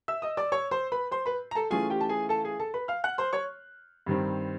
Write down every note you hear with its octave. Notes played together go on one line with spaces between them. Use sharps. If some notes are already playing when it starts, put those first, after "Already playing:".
E5 E6
D#5 D#6
D5 D6
C#5 C#6
C5 C6
B4 B5
C5 C6
B4 B5
A#5
A4 A5
E3 A3 C#4 F4 G#4 G#5
G4 G5
A5
G#4 G#5
A4 A5
G#4 G#5
A4 A5
B4 B5
F5 F6
F#5 F#6
C5 C6
C#5 C#6
G2 D#3 G3 C4